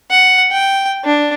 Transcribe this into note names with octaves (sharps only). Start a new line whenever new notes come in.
F#5
G5
D4